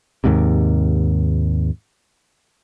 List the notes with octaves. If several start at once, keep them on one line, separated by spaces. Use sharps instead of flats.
D#2 G#2 C3